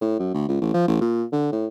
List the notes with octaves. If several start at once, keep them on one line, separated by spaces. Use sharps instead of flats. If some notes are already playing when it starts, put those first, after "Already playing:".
A2
F#2
D2
C#2
A1
F3
A1
A#2
D3
A2